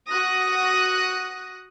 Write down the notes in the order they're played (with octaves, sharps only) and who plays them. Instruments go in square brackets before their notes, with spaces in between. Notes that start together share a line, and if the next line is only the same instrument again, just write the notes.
[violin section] F#4 D#6 F#6 A#6